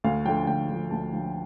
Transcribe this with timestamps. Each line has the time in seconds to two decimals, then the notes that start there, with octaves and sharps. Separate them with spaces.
0.04 D2 F5
0.25 D3 F3 G5
0.47 D2 G5
0.69 D3 F3
0.91 D2 A5
1.12 D3 F3